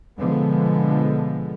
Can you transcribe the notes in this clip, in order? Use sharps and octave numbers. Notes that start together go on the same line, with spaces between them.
B2 D3 F3 G#3 B3